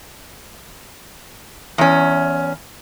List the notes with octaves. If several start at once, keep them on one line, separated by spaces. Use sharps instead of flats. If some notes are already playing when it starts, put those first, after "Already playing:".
E2 C#4